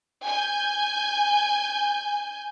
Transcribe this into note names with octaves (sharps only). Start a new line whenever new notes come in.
G#5 G6